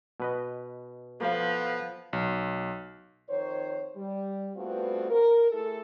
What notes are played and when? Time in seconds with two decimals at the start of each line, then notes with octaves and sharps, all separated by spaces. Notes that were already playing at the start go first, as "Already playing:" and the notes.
0.20 B2 B4 D#5
1.20 F3 B3 A4 F5
2.13 B1
3.29 F2 D#3 C5 C#5
3.96 G3
4.56 G2 A3 B3 C4 F4 F#4
5.10 A#4
5.51 A3 E4 G#4 A4